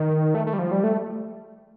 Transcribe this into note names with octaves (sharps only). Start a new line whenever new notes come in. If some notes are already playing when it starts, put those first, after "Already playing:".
Already playing: D#3
A3
A3
G3
F3
G3
A3